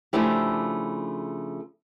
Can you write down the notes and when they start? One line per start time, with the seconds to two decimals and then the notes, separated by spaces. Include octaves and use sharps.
0.13 C#3 F3 A3 D4 E4 G4